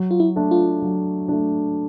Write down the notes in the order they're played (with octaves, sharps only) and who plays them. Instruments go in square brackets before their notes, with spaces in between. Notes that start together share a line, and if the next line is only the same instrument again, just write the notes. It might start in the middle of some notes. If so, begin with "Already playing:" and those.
Already playing: [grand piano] F#3
[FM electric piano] F4
E4
[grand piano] A3 D4
[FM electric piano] F4
[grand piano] F#3
A3 D4